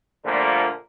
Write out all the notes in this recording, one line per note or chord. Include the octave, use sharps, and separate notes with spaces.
A#2 D3 F3 G3 A3 A#3